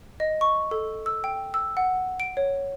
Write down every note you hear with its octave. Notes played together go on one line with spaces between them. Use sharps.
D#5
C#6
A4
E6
G5
E6
F#5
D7
C#5